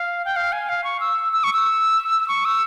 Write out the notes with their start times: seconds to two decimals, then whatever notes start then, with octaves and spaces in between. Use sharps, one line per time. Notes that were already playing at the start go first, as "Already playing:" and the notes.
Already playing: F5
0.25 G5
0.36 F5
0.52 G#5
0.69 F5
0.84 C#6
1.00 E6
1.33 E6
1.44 C#6
1.53 E6
2.28 C#6
2.45 E6